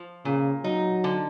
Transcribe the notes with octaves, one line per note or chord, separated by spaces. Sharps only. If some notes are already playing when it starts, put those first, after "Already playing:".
Already playing: F3
A#2 C#3
F#3 D#4
D3